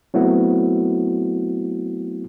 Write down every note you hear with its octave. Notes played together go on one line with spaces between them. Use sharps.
F#3 A3 B3 C4 E4 F#4